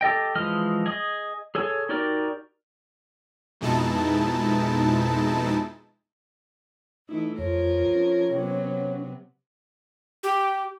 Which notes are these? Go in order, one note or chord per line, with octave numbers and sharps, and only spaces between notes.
G4 A4 D#5 G5
E3 F3 G#3 D#5 F6
G#4 D#5 D#6
G#4 A4 C#5 G#5
D#4 F#4 G4 A#4 D5
F2 B2 G#3 D#4 E4 A5
E3 A3 D#4 E4
F2 F3 F4 A#4 C#5
C#4
C3 F#3 B3
G4